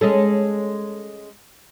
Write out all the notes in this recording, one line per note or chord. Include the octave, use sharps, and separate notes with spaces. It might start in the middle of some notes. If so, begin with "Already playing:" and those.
G#3 C#4 A4